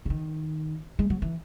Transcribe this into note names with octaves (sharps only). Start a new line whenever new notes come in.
C#3
D#3
G#3
F#3
E3